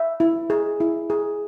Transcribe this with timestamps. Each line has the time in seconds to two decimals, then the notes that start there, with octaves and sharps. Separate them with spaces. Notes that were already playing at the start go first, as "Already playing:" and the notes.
Already playing: E5
0.20 E4
0.50 G#4
0.80 E4
1.10 G#4